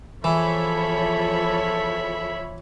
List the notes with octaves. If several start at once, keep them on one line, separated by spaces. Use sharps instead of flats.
E2 E3 F3 A4 C#5 E5 B5